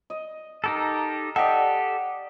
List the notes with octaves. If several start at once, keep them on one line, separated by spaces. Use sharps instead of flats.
D#5
D#4 G4 A4 A#4
G4 A4 D5 D#5 F#5 G5